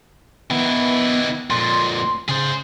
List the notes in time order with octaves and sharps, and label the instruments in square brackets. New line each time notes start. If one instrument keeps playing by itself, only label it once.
[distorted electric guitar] D#3 E4 [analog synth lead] B3
[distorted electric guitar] F2 A#2 [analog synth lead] C6
[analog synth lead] C#3 [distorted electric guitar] G#4 C5